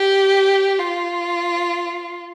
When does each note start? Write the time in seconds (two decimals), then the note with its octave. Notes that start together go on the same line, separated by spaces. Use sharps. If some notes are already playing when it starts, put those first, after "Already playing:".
Already playing: G4
0.78 F4